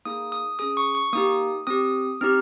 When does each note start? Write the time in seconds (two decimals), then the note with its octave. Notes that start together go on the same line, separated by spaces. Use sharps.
0.05 A#3 D#4 G#4 D#6
0.32 D#6
0.59 C#4 G#4 D#6
0.77 C#6
0.95 C#6
1.13 A#3 D#4 G4 D#6
1.67 C4 G4 D#6
2.21 C4 D#4 G4 F6